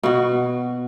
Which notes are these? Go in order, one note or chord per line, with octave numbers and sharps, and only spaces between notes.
B2 F#4